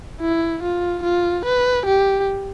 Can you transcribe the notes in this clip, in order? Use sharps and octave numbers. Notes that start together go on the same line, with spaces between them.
E4
F4
F4
B4
G4